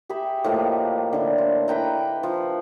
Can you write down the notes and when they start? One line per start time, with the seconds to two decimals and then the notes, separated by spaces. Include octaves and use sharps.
0.09 G4 G#4 E5 B5
0.44 A2 F3 A#3 D#5
1.13 D3 E4
1.38 C5
1.68 E4 B4 G5 A#5
2.23 F3